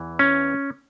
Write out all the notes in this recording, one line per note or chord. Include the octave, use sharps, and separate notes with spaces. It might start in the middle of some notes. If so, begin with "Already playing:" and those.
Already playing: E2 E3
C#4